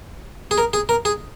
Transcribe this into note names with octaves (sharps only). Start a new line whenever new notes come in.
G#4
A#4
G#4
A#4
G#4